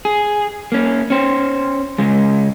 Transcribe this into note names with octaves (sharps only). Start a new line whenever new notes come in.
G#4
A#3 C#4
C#4 C5
C#3 G#3